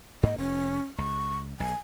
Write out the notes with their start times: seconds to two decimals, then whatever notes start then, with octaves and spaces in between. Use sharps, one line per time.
0.23 G#2 A#3 D#5
0.38 F1 C#4
0.98 C#2 C#6
1.60 B1 G#5